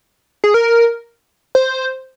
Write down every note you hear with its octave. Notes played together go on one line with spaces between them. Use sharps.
G#4
A#4
C5